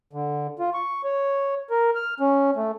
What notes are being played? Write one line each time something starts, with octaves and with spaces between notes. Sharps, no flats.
D3
F4
C#6
C#5
A#4
F6
C#4
A3